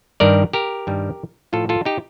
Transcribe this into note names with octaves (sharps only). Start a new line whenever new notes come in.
G2 D#3 G3 A#4 D5
G4 A#4
G2 D#3 G3
A2 F3 F4 A4
F4 A4
D#4 G4